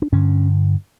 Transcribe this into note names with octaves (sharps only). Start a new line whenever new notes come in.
D4
G2 D3 C#4